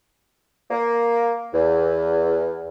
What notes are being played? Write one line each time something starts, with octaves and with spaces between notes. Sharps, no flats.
A#3
E2